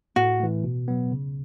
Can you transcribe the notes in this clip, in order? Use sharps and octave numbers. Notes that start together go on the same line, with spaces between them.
A2 F#4
E3 A3
B2
F#3 B3
C#3